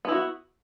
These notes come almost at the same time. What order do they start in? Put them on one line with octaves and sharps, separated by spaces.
B3 E4 F#4